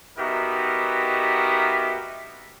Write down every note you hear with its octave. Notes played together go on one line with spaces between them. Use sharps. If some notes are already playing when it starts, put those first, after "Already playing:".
B3 D#4 F#4 G4 A#4 E5